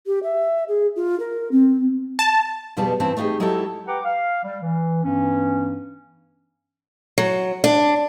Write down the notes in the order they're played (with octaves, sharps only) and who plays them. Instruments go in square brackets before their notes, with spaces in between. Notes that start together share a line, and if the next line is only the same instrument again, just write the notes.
[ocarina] G4
E5
G#4
F4
A#4
C4
[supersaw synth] A5
[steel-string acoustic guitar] F2 B2 G3 B3 G#4 A5
G2 E3 C4 A5
A3 D#4 F4 G4 G#4
F#3 G#3 D#4 E4 G4 A4
[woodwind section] G4 B4 F#5 G5 A#5 D6
F5
G3
E3
G2 E3 B3 C#4
[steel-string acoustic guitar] F#3
D4